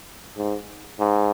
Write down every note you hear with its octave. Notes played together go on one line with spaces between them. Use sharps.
G#2
G#2